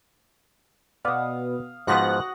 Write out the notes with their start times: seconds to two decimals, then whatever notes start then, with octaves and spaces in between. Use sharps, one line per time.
1.05 B2 B3 D5 F5 D#6
1.87 G#2 F3 B3 F#4 F#5 D#6 F#6 A#6